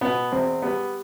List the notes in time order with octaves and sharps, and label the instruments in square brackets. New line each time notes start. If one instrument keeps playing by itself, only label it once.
[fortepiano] B2 B3
E2 C4
G3 B3